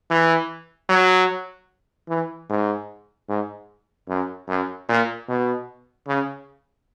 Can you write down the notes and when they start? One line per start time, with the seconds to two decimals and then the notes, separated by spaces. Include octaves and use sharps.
0.10 E3
0.89 F#3
2.09 E3
2.50 G#2
3.29 G#2
4.09 F#2
4.48 F#2
4.89 A#2
5.28 B2
6.08 C#3